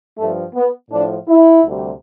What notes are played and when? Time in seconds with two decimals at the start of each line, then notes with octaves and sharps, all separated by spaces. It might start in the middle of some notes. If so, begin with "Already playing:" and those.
0.17 G2 F3 A3
0.54 B3
0.90 A2 F3 D4
1.28 E4
1.64 D2 C3 G3